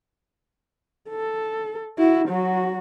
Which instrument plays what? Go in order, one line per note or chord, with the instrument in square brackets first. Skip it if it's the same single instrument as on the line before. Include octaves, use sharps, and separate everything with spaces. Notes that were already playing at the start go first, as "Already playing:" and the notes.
[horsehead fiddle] A4
E4 F#4
F#3 F#4